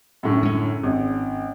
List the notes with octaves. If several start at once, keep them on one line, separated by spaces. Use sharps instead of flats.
F#2 A2 D3
G#3 C#4
G#1